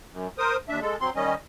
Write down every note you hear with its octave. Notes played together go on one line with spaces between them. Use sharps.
F#2
A#4 C5 D#6
D#2 D4 E5
G#3 A4
F#3 C4 C6
D#3 G3 C#4 D#5